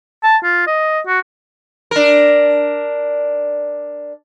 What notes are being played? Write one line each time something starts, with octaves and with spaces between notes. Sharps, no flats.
A5
F4
D#5
F#4
D4 A#4